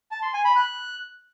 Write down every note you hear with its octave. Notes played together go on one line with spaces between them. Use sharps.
A5
C6
G#5
B5
F#6